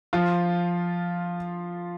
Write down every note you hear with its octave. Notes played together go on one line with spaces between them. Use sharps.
F3 F4